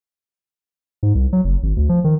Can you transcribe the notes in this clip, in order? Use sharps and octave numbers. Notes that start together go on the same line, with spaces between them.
G#2
C2
F#3
F#1
G#1
D2
F3
D#3